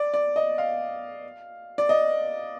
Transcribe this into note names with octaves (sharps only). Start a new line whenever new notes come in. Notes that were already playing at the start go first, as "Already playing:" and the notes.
Already playing: D5
D5
D#5
F5
D5
D#5